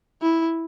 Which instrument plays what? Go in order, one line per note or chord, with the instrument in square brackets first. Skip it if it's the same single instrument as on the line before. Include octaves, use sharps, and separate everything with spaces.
[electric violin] E4